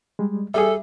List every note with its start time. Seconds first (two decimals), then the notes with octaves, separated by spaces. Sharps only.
0.19 G3 G#3
0.54 G3 G#4 A4 E5